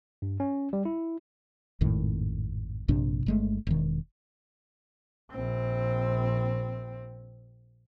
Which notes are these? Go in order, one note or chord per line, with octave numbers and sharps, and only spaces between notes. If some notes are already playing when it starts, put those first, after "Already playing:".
G2
C#4
G3
E4
G#1 F2 A2 D#3
A#1 G2 C3 D4
G1 G#3 A3
E1 D#3
A#1 C4